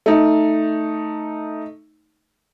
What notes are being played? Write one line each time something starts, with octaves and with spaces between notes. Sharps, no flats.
A3 D#4